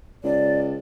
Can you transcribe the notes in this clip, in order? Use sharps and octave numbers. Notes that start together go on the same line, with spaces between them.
C#2 D5